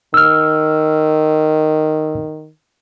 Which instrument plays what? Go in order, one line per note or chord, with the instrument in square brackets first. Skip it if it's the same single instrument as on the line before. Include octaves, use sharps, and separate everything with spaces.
[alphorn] D#3 [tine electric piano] E6 F6